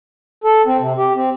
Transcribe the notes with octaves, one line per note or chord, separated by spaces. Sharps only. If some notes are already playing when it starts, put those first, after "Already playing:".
A4
C4
C3
G4
C4